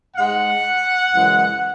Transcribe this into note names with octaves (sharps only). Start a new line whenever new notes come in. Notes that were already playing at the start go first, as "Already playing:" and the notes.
G#2 G#3 F#5
F#2 C#3 E3 G#3